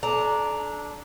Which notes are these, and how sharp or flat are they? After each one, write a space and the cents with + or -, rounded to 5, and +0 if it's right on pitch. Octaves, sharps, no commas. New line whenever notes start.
D4 -5 A4 -35 A#5 -5